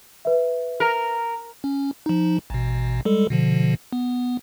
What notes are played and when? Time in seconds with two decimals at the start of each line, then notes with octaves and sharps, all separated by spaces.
0.25 B4 E5
0.80 A#4
1.64 C#4
2.06 F3 D#4
2.50 A1 B2
3.05 G3 G#3 A4
3.30 B2 D3 F3
3.93 B3